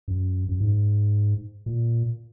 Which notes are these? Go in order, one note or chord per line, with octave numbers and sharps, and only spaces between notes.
F#2
F#2
G#2
A#2